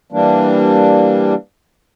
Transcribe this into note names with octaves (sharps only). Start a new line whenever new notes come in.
E3 G3 A#3 D4